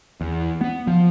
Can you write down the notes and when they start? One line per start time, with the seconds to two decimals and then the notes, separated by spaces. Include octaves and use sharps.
0.21 E2
0.61 B3
0.87 F3